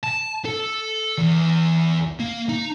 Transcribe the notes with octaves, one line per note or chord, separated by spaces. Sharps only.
A5
A4
E2
A#3
D#4